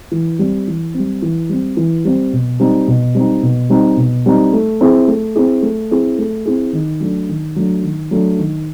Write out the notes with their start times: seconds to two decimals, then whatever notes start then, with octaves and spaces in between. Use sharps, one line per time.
0.12 E3
0.39 G3 C4
0.68 E3
0.94 G3 C4
1.22 E3
1.49 G3 C4
1.77 E3
2.05 G3 C4
2.33 B2
2.60 G3 C4 D#4
2.88 B2
3.15 G3 C4 D#4
3.43 B2
3.70 G3 C4 D#4
3.97 B2
4.26 G3 C4 D#4
4.53 A3
4.81 C4 E4 G#4
5.08 A3
5.36 C4 E4 G#4
5.63 A3
5.91 C4 E4 G#4
6.19 A3
6.46 C4 E4 G#4
6.73 D#3
7.00 F#3 A3 D4
7.29 D#3
7.56 F#3 A3 D4
7.83 D#3
8.11 F#3 A3 D4
8.39 D#3